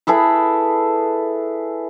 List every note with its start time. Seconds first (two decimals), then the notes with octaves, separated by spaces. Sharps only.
0.07 E4 G#4 A4 B4